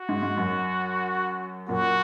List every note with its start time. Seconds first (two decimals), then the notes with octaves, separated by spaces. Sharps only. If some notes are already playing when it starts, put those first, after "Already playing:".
Already playing: F#4
0.09 G#2
0.23 G#2
0.38 F#2
1.68 F#2 A#2 F#4